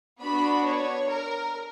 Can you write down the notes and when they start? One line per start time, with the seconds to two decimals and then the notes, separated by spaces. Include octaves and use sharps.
0.22 B3 D4 F#4 B5
0.66 C#5
1.10 A#4